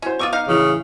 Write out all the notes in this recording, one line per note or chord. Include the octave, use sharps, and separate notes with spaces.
C#4 E4 F#4 C5
B3 F4 D#5 C#6 D6 D#7
D#4 F5
A1 C#3 E3 F7